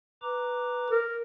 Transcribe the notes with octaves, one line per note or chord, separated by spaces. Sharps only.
B4 A#5 D6
A#4